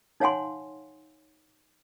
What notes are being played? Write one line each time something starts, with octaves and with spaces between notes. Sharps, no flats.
D#4 C#5 F5 F#5 G#5 C6